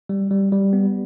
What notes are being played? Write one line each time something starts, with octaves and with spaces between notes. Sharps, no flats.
G3
G3
G3
B3